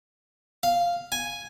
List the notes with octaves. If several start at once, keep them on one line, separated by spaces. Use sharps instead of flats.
F5
G#5